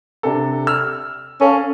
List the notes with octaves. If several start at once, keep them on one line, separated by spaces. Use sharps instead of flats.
C3 D4 A4
E6 F6
C#4 A4 F5 A5